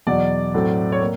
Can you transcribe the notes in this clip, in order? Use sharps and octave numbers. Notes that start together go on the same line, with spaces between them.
E2 B2 F#3 D5
A2 F#3 A3 C4
C#5
A#3